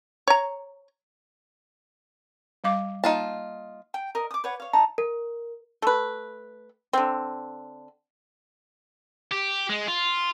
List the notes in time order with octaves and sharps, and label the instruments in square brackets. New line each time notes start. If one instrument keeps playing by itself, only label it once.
[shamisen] C#5 A#5
[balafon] G3 F5 D6
[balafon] A#3 [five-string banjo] D#4 F4 A5
[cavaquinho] G5
A#4 D#5
D6 D#6
B4 C#5 F#5
C#5 F5
D#4 A5 A#5
[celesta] A#4
[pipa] A3 B4
D3 C4
[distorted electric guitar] G4
G#3
F4